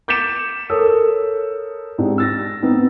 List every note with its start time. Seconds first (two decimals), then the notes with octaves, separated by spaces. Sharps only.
0.08 D6 G6 A6 B6 C#7 E7
0.70 A4 A#4 C#5 D#6 E6
1.98 G#2 C4 D4 G4
2.18 E6 A6 A#6
2.62 B3 C4 D#4